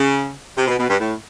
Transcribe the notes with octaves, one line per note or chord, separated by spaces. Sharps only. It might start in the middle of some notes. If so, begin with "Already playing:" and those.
Already playing: C#3
C3
B2
B2
G2
A2